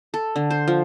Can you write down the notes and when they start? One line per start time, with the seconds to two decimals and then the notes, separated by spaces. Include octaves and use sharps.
0.14 A4
0.36 D3
0.50 C5
0.68 F3